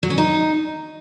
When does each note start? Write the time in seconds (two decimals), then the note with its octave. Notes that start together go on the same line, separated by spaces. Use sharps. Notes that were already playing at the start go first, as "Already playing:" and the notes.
0.03 F#3
0.10 C#4
0.18 D#4